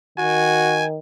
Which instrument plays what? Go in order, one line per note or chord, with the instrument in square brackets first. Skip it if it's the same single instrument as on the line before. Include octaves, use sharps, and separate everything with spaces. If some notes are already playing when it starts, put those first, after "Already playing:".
[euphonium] D#3 [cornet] F#4 [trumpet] G#5